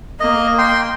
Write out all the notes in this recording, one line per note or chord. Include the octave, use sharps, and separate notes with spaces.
A#3 D#5
G5 C6